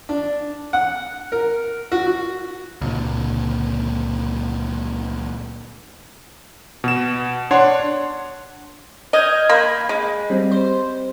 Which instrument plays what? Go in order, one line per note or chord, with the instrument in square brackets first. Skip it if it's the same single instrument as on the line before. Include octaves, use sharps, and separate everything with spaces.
[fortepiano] D4
F#5
A#4
F#4
F#4
[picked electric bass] C#2 A#2 D3
[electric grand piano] B2 E7
D4 C#5 F#5 C6
[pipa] D#5 [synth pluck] F6 G6 G#6
[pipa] A#3 [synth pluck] B5
[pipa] G#3
[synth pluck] G3 C4
C5